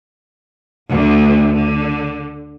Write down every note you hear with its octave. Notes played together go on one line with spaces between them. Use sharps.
D2 D3
D3